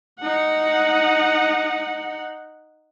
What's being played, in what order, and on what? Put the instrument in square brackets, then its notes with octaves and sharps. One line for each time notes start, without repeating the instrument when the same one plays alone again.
[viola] D#4 F#5